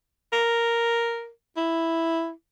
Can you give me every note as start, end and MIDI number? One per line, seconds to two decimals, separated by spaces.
0.33 1.30 70
1.57 2.31 64